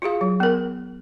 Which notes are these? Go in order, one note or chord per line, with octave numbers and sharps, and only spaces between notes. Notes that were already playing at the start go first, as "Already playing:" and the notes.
F4 F#4 G#4 F5
F#3
B3 A#4